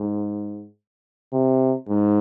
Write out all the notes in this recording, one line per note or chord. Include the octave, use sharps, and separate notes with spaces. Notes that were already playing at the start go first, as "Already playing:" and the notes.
Already playing: G#2
C3
G#2